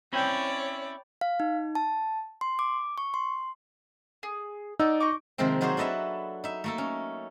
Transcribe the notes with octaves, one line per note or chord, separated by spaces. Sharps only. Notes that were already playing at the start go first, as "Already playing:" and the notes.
C4 C#4 E4 C#5 D5 G5 B5
F5
D#4
A5
C6
D6
C#6
C6
G#4
D#4 D5 F#5 E6
D#5 C#6 D6
C3 D#3 F3 G#3 A#3 C4
F#3 D#4 F4 F#4 G#4 C5
D4 A4 B4 D#5 E5
D#4 E5
A3 A#3 A4
C#4